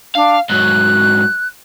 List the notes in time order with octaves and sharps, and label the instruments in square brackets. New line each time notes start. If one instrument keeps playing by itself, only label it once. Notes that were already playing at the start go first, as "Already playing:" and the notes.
[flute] D4 [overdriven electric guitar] F5
[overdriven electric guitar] G#2 F#3 [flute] F#6